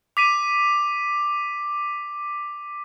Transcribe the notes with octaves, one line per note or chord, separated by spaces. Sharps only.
D6 B6 D#7